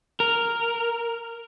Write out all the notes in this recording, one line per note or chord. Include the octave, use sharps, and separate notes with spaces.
A#4